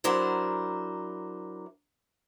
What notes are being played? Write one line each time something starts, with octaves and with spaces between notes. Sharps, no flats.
F#3 D4 E4 A#4 C5